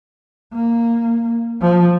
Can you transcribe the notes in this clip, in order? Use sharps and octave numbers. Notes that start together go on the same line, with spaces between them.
A#3
F3